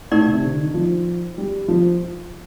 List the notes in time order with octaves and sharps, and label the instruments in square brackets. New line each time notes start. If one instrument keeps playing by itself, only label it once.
[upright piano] A2 [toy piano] D#4 G4 A#4 D5
[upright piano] C3
D3
D#3
F3
G3
F3